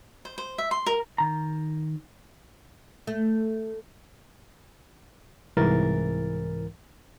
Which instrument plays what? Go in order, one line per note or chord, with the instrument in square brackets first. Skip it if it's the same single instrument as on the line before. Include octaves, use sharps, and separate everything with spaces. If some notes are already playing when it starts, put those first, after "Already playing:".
[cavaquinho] C5
C5
E5
C6
A#4
[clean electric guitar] D#3 A#5
[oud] A3
[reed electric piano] C2 G#2 E3 A#4 A6